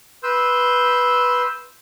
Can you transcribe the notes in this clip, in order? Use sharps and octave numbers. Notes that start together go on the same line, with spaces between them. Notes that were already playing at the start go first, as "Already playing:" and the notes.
B4 C6 E6 G6